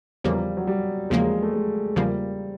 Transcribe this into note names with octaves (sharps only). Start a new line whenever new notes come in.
E2 C#3 F3 G3 A#3
F#3
G3
E2 C#3 F3 G#3 A#3
A3
G#3
E2 C#3 F3 G3 A#3